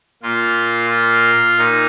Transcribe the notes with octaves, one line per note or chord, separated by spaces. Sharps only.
A#2 F4
F4
A#2 D#4